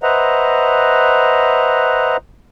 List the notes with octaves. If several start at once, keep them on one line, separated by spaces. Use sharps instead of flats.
B4 C5 D#5 E5 F#5 A#5